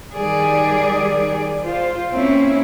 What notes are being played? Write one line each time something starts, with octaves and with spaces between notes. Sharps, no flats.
D#3 G3 G#4 D5
F4 C5
A#3 C4 C#4 E4